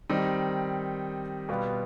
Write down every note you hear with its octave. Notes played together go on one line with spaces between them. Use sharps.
D#3 G3 C4 D#4
B2 G3 B3 F4